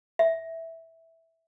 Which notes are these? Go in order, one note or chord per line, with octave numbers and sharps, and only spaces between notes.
E5